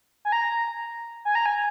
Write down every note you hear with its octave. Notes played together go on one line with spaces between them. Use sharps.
G#5
A#5
G#5
A#5
G#5